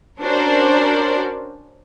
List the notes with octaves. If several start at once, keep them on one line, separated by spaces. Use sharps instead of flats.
C#4 D4 F#4 A#4 C5 D5